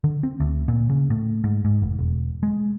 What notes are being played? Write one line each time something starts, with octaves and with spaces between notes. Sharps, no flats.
D3
C4
D2
A#2
C#3
A2
G#2
G#2
F1
E1
G#3